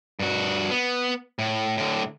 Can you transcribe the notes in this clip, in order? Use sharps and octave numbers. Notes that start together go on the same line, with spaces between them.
G2 F#4
B3
A2
A2 D3